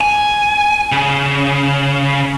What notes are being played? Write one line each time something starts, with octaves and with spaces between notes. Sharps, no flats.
G#5
C#3